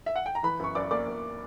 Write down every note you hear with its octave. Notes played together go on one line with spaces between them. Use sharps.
E5
F#5
G5
A#5
E3 B4 B5
F#2 C#6
F#2 D5 D6
A#3 D5 D6
F#2